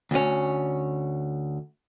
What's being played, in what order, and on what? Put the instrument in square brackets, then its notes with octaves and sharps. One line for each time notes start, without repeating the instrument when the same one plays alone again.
[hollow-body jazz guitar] D2 C#4